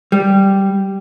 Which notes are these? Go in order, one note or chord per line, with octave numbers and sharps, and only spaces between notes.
G3